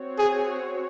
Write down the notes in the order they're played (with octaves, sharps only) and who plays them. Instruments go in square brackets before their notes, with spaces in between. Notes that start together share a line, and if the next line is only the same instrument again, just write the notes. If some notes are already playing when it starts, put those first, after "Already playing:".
Already playing: [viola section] C4 F#4 C#5
[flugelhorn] G#4